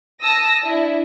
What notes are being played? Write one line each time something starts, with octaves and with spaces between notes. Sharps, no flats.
A5 D#6 E6 A#6
D4 E4